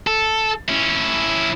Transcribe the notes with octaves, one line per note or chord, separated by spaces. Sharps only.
A4
C#4 E4